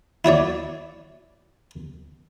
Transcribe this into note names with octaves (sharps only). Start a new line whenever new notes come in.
E4 F#4 C#5 D5